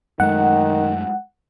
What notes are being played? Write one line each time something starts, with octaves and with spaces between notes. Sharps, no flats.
F#2 D#3 G#3 A3 F#5